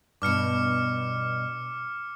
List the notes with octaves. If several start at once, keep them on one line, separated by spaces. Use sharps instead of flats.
G2 B2 D6 F6 C#7